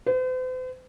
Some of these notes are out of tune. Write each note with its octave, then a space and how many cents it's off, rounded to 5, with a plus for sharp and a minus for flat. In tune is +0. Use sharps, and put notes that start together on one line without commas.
C5 -45